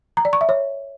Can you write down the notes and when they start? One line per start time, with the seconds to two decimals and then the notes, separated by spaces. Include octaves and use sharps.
0.17 A#5
0.25 D5
0.33 C#6
0.41 E5
0.49 C#5